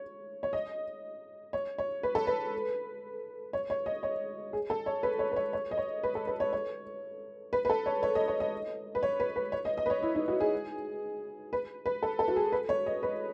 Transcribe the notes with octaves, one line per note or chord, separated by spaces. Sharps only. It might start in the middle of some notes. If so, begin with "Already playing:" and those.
Already playing: C#5
C#5
D#5
C#5
C#5
B4
A4
B4
C#5
C#5
D#5
C#5
G#4
A4
C#5
B4
C#5
B4
C#5
C#5
D#5
C#5
B4
A4
B4
C#5
C#5
B4
B4
A4
C#5
C#5
D#5
C#5
D#5
B4
C#5
B4
B4
C#5
D#5
D#5
B4
C#5
E4
D#4
F#4
G#4
B4
B4
A4
A4
F#4
G#4
B4
C#5
D#5
B4